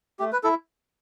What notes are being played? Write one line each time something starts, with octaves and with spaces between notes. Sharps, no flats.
A3 G4
B4
E4 A4